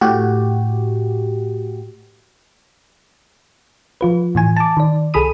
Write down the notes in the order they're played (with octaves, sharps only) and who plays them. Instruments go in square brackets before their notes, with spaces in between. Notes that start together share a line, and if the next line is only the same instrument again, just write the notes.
[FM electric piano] A2 F#4 G4
[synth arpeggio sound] F3 F4 B4
A2 E3 G#5
A5 D6
D#3 D5
C2 G#4 A4 B5 D#6 D#7